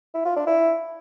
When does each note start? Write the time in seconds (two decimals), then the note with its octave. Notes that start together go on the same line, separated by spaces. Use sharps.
0.14 E4
0.25 F4
0.36 D4
0.47 E4